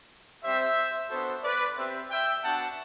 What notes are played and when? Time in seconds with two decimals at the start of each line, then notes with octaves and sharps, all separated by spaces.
0.43 G3 C4 G4 C5 E5
1.10 B3 D4 F#4 A4 C5
1.43 B4 D5
1.77 C4 G4 C5 E5
2.10 E5 G5
2.43 B3 D4 F#4 F#5 A5